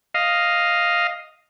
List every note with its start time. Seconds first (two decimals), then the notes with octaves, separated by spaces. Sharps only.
0.14 D#5 F5